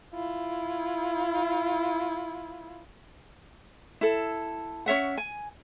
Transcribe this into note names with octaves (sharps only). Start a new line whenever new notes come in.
E4 F4
E4 A4
C#4 C#5 E5 F#5
G#5